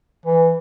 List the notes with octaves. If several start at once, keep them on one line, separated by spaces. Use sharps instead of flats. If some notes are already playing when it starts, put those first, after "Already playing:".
E3